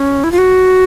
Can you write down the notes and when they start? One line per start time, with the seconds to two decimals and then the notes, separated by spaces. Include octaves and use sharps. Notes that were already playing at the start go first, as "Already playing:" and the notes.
Already playing: C#4
0.24 E4
0.32 F4
0.38 F#4